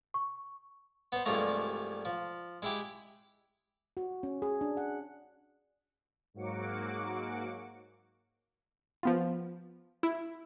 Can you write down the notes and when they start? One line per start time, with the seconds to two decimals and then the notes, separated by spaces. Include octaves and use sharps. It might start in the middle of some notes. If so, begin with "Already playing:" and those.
0.14 C#6
1.12 B3 C5
1.25 C2 G2 F3 G#3 A3 A#5
2.05 F3
2.62 G#3 E4 G4
3.97 F#4
4.23 C#4
4.42 G#4
4.61 D4
4.77 F#5
6.34 G#2 F#3 A#3 F#4 D6 C#7
9.03 F3 B3 F4
10.03 E4